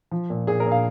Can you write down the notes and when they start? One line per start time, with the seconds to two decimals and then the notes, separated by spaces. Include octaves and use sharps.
0.11 F3
0.30 A#2
0.47 A#2 G#4
0.60 A#4
0.66 A#2
0.71 F5